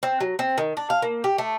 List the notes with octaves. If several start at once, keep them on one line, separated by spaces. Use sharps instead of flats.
C4
F#3
C4
D#3
D4
F5
A#3
G4
A3